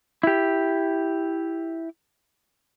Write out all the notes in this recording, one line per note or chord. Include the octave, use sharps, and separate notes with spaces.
E4 G4